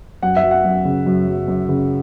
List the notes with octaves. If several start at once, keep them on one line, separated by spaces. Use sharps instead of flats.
F#2 F#5
E5
F#3
F#5
F#2
C#3
F#2
F#3
F#2
C#3